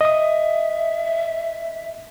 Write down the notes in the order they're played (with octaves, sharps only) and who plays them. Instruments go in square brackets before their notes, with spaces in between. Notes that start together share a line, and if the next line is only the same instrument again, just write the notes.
[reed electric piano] D#5 D#6 [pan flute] E5